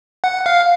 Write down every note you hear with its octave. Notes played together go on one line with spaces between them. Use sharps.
F#5
F5